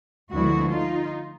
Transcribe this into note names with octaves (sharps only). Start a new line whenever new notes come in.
D2 D3 F3 G#3 B3 E4 F#4
D#4 F4